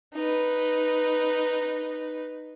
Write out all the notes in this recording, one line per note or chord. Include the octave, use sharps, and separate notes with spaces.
D#4 B4